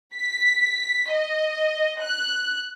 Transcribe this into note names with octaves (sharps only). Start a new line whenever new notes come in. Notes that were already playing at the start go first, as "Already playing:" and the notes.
B6
D#5
F#6